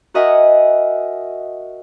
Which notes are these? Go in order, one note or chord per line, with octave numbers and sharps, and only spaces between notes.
F#4 A#4 D#5 E5 F#5 G#5